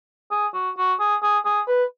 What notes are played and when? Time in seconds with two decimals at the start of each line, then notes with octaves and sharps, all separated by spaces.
0.31 G#4
0.54 F#4
0.78 F#4
1.00 G#4
1.23 G#4
1.45 G#4
1.68 B4